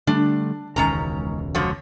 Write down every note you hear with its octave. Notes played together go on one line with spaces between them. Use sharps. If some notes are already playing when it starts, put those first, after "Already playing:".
D3 G3 A3 D4
E1 C#2 D#3 C#4 A#5
D3 F3 F#3